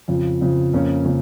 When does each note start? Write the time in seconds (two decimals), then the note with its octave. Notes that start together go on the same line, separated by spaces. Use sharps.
0.08 F2 C#3 F3
0.41 F2 C#3 F3
0.73 F2 C#3 F3 A#3 C#4
1.05 C#3 F3 A#3 C#4